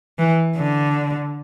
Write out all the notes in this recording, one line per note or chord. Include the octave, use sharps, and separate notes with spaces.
E3
D3